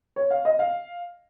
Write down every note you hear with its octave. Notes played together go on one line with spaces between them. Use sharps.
C#5
F5
D#5
F5